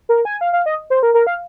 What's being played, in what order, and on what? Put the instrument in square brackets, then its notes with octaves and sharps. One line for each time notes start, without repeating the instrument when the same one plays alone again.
[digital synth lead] A#4
G#5
F5
F5
D#5
C5
A#4
A#4
F5